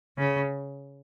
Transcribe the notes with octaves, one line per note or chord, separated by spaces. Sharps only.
C#3